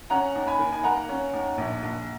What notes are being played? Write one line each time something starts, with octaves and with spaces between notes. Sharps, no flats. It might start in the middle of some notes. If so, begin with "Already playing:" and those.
C#4 F#5 A#5
D#2
G#5 B5
D#3
G#5
A#3 F#5 A#5
C#4
D#2
A#1
A#1